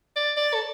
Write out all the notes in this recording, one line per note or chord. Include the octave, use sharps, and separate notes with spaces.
D5
D5
A4